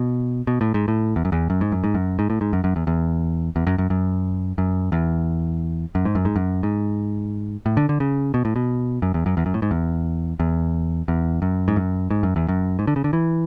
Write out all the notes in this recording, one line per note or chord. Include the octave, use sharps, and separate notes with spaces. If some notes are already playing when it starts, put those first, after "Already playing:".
Already playing: B2
B2
A2
G#2
A2
E2
F#2
E2
F#2
G#2
F#2
G#2
F#2
G#2
A2
G#2
F#2
F#2
E2
E2
E2
F#2
F#2
F#2
F#2
E2
F#2
G#2
F#2
G#2
F#2
G#2
A2
D3
D3
C#3
B2
A2
B2
F#2
E2
F#2
E2
F#2
A2
G#2
E2
E2
E2
F#2
G#2
F#2
G#2
F#2
E2
F#2
G#2
D3
C#3
D3
E3